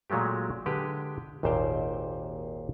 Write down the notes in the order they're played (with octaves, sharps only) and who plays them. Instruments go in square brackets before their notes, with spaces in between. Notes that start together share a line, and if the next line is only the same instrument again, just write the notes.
[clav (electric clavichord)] A#2 F#3 G#3 A3 G4
D3 G#3 G4 B4
G#1 D#2 A#2 C5 F5 G5